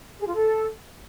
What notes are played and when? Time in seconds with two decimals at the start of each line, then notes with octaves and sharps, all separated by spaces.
0.20 G#4
0.27 F4
0.34 A4